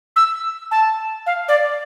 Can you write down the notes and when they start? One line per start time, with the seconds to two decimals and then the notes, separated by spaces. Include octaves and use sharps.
0.16 E6
0.71 A5
1.26 F5
1.48 D5